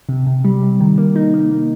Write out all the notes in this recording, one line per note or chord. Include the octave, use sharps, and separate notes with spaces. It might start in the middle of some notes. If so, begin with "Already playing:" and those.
C3
C3
G3
C3
D#3
A#3
D#4
A#3
A#3